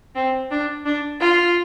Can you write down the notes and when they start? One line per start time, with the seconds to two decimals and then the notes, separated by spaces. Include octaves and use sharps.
0.15 C4
0.51 D4
0.86 D4
1.20 F4